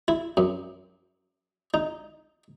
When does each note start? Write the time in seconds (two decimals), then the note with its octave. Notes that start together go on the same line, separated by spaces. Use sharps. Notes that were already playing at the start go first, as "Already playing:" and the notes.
0.08 E4
0.37 F#2
1.74 D#4